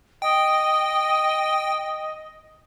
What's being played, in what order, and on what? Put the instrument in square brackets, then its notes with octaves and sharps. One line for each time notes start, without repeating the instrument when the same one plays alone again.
[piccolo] D#5 [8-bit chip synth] G5